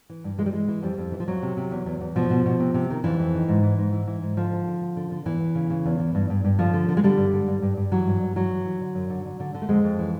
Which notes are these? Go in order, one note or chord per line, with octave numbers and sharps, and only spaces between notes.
E3
G2
E3 G#3
G3
E3 G#3
E3
F2 G3
F2
E3
F3
F2 F#3
C3
C3
E2
E2
E2
B2 F3
B2
B2
C3
C3
D#3
F2 E3
F2
D#3
G#2
E3
G#2
E3
E3
G#2
D3 F3
D3
D3
D3
D3
D3
E2 E3
E2
C#3
C#3
E2
E3
G2
G2
G2
D3 F3
D3
D3
G#3
D3 G3
G2
D3
G2
G2
G2
E3 F#3
G2
G2
E3 F#3
E3
E3
D3
F#2
D3
D3
D3
D3
A3
F2 G#3
F2
E3